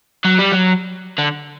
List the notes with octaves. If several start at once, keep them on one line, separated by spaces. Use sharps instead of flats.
F#3
G3
F#3
D3